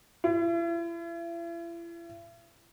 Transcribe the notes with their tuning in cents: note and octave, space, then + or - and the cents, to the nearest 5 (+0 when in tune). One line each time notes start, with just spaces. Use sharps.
E4 +40